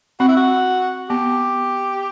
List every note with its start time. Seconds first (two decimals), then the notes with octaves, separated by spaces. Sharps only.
0.20 C4 F#4
0.28 E4
0.37 F#4
1.10 B3 G4